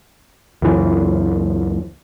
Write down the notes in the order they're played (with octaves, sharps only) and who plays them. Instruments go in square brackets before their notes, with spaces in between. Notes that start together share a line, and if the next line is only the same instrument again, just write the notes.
[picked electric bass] C#2 F#2 E3